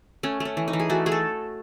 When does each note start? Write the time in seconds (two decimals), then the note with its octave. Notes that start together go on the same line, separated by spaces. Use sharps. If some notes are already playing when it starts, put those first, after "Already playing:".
0.23 A3 C#4
0.40 A3
0.45 C#4
0.57 E3
0.68 D#4
0.73 E3
0.80 G#4
0.90 A3 F#4
1.06 A3 G#4
1.12 A4